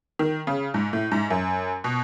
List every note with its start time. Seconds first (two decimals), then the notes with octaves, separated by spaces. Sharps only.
0.19 D#3
0.47 C#3
0.74 G#2
0.93 A2
1.12 G#2
1.30 F#2
1.84 B2